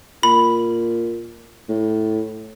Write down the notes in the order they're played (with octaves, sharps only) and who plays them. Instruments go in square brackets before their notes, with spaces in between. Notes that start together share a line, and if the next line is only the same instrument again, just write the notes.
[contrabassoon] A#2 [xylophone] B5
[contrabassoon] A2